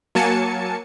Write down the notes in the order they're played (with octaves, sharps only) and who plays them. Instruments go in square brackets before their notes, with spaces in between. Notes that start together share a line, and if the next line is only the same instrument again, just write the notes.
[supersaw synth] F#3 A#3 G#5 A5 C#7